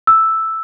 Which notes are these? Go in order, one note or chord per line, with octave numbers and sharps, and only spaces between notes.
E6